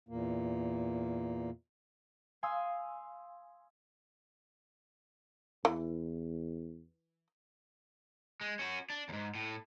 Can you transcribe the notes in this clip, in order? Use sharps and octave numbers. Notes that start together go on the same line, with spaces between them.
E2 A#2 A#3
F5 G#5 C6 D#6 E6
E2 E3
G#3
C#4 F#4
D4
D#2 G#2
A2